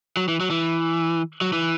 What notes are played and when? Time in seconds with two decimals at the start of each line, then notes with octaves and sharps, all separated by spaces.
0.17 F#3
0.28 E3
0.40 F#3
0.50 E3
1.41 F#3
1.53 E3